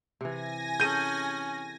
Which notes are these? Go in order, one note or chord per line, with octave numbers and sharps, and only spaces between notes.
C3 E3 G#5 A#6
C#4 G#4 A4 G6 D#7